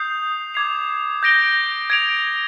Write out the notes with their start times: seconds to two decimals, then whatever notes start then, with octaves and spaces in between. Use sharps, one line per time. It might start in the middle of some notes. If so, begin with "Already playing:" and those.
Already playing: D#6 G6 C7
0.54 D6 G#6 C7 F7
1.23 G6 A#6 D7 G7
1.90 G#6 D7 F7